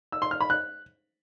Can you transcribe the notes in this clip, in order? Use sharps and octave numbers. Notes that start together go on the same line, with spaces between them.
E6
C6
F6
B5
F#6